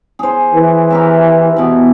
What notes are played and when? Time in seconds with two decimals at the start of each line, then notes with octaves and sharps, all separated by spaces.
0.19 G#4 C5
0.54 E3
0.90 G4 A#4 E5
1.56 B2 E3